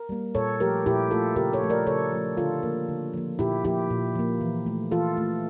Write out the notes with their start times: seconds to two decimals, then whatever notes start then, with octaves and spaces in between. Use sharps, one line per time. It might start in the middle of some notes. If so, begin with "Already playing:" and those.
Already playing: A#4
0.09 G3 A#3
0.35 A#2 A4 C#5
0.60 F3 A3 G4 A#4
0.86 A#2 E4 G4
1.11 F3 A3 F4 A4
1.36 C#3 G4 A#4
1.53 A4 C#5
1.62 F3 A3
1.70 A#4 D5
1.87 C#3 A4 C#5
2.12 F3 A3
2.37 D3 F4 A4
2.63 F3 A#3
2.89 D3
3.14 F3 A#3
3.39 A#2 E4 G4
3.65 F3 A#3 E4 G4
3.90 A#2
4.15 F3 A#3
4.41 E3
4.66 A3
4.91 E3 F4 A4
5.17 A3